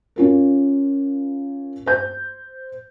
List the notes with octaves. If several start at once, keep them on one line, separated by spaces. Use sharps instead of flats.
C#4 F4 A#4
C5 G6